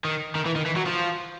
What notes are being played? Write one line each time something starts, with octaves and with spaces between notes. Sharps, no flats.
D#3
D#3
E3
D#3
E3
F#3
F3